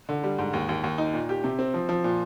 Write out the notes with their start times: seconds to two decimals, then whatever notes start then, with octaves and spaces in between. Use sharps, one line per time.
0.09 D3
0.24 G3
0.38 G#2
0.53 D#2
0.69 D#2
0.84 D#2
0.98 D#4
1.13 A#2
1.29 G4
1.44 C3
1.59 C4
1.74 F3
1.89 F3
2.04 A#2